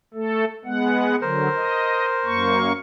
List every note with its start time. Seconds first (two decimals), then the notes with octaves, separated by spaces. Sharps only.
0.14 A3 A4
0.65 G#3 B3 F#5
1.22 D3 F#3 A#4 C5
1.56 D#5
2.25 F#2 A#3 C#6